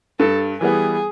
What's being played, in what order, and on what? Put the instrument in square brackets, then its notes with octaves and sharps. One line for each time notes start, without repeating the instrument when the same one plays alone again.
[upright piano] G2 [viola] A4
[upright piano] E3 G3 B3 [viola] G#4